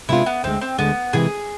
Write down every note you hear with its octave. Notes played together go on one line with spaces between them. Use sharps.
C3 G#3 B3 D4 E4 F4
B3
D2 D3 G#3 C4
C4
D2 D3 G#3 B3
C3 E3 G#3 G#4